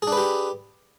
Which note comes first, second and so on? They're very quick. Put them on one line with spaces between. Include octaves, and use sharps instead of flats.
G#4 D4 B4 G4